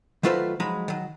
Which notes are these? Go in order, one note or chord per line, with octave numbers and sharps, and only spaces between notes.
D#3 F#3 A3 F4 B4 C5
F3 F#3 G#3 D#4 B5
D#3 F#3